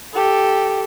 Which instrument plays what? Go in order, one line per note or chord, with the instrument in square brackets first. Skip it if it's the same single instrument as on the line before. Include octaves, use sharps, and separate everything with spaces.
[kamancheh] G4 A4